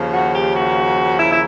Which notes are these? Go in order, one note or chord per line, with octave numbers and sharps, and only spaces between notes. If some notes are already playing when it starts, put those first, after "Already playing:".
Already playing: D#2 C#3 F3
F#4
G4
F#4
E4
E4